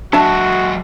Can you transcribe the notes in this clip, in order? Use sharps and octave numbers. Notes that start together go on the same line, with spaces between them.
F#3 G#3 D4 F#4 E5 A5